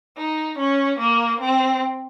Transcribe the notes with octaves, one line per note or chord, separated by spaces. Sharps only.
D#4
C#4
A#3
C4